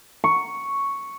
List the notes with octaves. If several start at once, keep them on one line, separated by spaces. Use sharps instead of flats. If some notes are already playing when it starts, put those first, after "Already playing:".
C#6